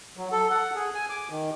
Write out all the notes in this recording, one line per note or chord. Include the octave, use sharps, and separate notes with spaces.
F#3
A4
F#5
G#4
G#5
D6
D#3